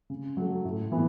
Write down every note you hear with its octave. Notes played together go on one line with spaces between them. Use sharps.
C#3
F#3 A3
A2
E3 B3 E4